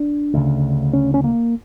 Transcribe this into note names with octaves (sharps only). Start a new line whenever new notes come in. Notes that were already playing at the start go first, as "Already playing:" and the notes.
Already playing: D4
D2 C#3
C#4
C#4
A#3